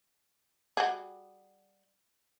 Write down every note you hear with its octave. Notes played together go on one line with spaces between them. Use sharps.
G3 F#4 G#4